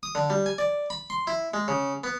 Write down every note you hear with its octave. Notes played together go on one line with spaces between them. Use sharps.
D#6
D3
G3
G#5
D5
B5
C6
E4
G#3
C#3
B3